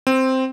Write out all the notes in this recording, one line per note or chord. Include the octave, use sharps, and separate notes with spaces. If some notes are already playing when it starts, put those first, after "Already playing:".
C4